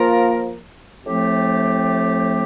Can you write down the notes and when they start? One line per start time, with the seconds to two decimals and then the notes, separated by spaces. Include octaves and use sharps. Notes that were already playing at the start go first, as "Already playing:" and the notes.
Already playing: F3 A#3 F4 A#4
1.04 A2 F3 A3 C4 G4